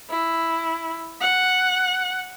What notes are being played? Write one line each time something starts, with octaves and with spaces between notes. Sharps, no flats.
E4
F#5